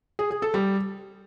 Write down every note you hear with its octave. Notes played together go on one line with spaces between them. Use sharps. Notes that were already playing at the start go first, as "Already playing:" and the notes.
G#4
G#4
A4
G3